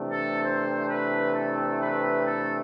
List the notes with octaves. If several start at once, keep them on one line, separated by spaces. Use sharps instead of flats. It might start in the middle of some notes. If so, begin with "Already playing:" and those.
Already playing: C3 E3 A3 D4
A4
C5
B4
A4
B4
A4